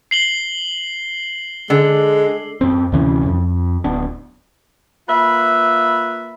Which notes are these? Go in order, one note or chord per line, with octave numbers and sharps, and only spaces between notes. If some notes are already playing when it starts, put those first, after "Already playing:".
C7 F#7 G7
D3 G#3
F#2 C4
D2 C3 E3 C#4
F2
D1 B3 D4
A#3 F4 B4 E5